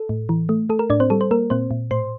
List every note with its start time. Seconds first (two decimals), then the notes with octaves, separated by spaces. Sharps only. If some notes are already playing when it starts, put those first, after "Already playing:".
Already playing: A4
0.09 A2
0.29 E3
0.49 A3
0.69 A3 A4
0.79 A#4
0.90 A2 D4 D5
1.00 C4 C5
1.10 G3 A4
1.21 C5
1.31 A#3 A#4
1.50 A#2 C4 C5
1.71 A#2
1.91 A2 C5 C6